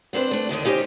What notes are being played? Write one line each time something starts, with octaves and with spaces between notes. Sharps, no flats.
B3 C4 D4 B4 C5
A3 D4
D#2 D3 D#3 D4
C#4 D#4 G4 A#4 C5